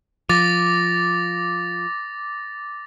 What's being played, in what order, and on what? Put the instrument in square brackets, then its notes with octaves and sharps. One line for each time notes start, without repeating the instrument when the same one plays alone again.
[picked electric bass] F3 [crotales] D6 A6 A#6